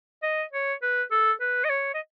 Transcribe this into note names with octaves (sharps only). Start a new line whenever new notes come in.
D#5
C#5
B4
A4
B4
D#5
C#5
D#5